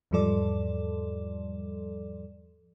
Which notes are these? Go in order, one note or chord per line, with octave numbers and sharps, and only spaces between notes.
E2 G#2 F3 G3 A4 D5